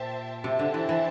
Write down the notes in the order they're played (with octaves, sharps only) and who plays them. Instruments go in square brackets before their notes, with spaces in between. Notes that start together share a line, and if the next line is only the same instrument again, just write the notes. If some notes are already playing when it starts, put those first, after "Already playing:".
Already playing: [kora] A#2 [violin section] G4 C5 E5 A5
[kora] C3 [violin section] D4 G4 C5 E5 A5
[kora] D3
E3
E3